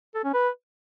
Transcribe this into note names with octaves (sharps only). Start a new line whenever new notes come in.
A4
C#4
B4